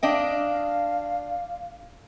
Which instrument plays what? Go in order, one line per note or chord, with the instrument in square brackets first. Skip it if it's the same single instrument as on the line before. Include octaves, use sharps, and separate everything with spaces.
[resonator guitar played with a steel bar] D4 D#5 G5 [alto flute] F5